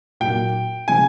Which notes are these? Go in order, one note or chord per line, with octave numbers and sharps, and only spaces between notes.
A#2 F#3 A#3 D#4 G5
C#3 F3 G#3 G#5